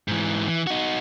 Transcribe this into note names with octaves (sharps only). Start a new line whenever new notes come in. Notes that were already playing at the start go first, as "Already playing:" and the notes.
G#2 E3
E3
D#4 F#4